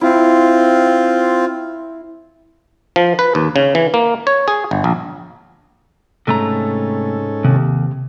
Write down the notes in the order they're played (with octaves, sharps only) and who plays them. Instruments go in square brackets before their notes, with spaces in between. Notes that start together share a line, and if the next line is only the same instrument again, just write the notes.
[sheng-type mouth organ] C4 F4 [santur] E4
[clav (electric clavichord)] F3
B4
D#2
C#3
E3
A#3
C#5
G#4
G1
A#1
[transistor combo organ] G#2 C#4 A4 [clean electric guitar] C3 A3 A#5
[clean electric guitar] D#2 [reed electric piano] C3